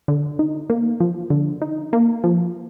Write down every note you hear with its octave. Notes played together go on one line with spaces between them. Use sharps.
D3
D#4
A#3
F3
D3
D#4
A#3
F3